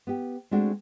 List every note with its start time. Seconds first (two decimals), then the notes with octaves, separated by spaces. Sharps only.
0.07 B3 G4
0.51 G#3 A3 C4 D4 F#4